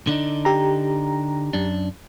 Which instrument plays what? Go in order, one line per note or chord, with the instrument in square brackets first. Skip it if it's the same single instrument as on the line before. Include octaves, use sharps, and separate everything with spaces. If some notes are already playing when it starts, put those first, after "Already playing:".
[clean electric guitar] D3 D4 D#4
[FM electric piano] G4 A#5
[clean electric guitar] F#2 D4